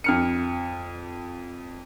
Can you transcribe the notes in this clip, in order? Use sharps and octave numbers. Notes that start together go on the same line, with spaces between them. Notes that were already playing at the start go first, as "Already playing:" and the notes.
F2 F6 C#7